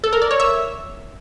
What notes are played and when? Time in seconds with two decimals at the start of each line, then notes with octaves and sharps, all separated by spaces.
0.04 A4
0.13 A#4
0.22 D5
0.31 C#5
0.40 E5